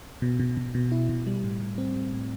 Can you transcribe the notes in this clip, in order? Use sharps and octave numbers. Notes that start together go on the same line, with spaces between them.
B2
B2
B2
B2
E4
B2
G3
A2
A2
C4
A2
A2